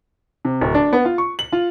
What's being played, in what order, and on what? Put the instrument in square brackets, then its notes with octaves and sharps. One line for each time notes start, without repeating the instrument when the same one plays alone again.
[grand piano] C3
D1
D4
B3
F4
C#6
F#7
F4